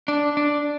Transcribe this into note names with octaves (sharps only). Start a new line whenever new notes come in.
D4
D4